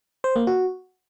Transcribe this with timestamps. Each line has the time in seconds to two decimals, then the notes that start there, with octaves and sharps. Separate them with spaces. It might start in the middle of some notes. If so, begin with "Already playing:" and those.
0.24 C5
0.36 A#3
0.47 F#4